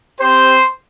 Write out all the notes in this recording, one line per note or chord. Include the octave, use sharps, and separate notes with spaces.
C4 G4 C5